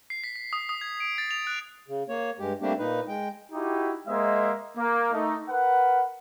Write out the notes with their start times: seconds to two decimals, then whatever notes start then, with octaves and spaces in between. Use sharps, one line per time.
0.10 C7
0.24 B6
0.36 B6
0.53 D#6
0.69 D#6
0.81 G#6
1.00 D7
1.18 A6
1.31 F7
1.47 F#6
1.88 C#3
2.09 A#3 C#5
2.40 G2 G#3 G4
2.62 G3 A3 A#3 C4 D4 G4
2.79 A#2 D#4 B4
3.08 G#3 G5
3.52 D#4 E4 F#4 G4
4.08 G#3 A#3 C5 D#5 E5
4.77 A#3
5.12 A3 D#4
5.50 A#4 B4 F#5